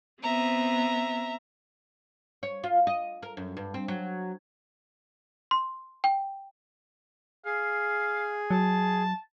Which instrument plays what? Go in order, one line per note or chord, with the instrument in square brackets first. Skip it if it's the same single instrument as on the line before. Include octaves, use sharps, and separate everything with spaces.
[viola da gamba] B3 C4 [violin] E5 A#5
[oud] C#5
F4
D#5
A#4
F#2
G2
C4
F#3
[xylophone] C6
G5
[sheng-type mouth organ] G#4 [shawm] F5
[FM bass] F#3 [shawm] A5